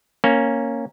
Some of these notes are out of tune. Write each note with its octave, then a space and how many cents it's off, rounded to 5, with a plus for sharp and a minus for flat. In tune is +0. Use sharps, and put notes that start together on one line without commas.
A#3 -5 C#4 -5